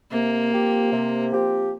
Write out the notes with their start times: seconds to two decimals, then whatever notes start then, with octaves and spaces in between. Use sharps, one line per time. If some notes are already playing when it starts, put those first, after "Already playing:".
0.11 C3 A#3
0.52 F3 C4 G4
0.92 C3
1.32 F3 C4 G4